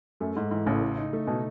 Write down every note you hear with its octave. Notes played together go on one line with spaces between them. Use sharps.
F#2 A3
G#2 A3
G#2 E3
A1 A2 C#3
A3
D#4
A3
B2 D#4